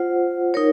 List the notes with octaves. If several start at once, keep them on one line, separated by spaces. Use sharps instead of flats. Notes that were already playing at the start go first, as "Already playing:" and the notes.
Already playing: F4 C5 F#5
D#4 A#4 C#5